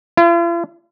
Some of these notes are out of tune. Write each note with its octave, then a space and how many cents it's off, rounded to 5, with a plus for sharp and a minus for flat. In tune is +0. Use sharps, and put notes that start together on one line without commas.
F4 -45